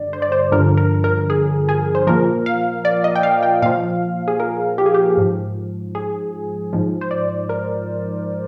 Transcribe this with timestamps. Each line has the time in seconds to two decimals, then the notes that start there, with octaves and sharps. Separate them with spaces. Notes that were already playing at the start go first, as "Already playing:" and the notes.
Already playing: G2 D3 D5
0.13 C5
0.22 D5
0.32 C5
0.52 G2 D3 F3 A#4
0.77 A#4
1.04 A#4
1.30 G#4
1.69 G#4
1.95 C5
2.07 A#2 F3 A#4
2.46 F5
2.85 D5
3.04 D#5
3.15 G5
3.23 F5
3.43 G5
3.62 A#2 F3 F5
4.28 G#4
4.40 A#4
4.78 G4
4.86 G#4
4.94 G4
5.17 G#2 F3
5.95 G#4
6.73 G#2 F3
7.01 C5
7.11 D5
7.49 A#4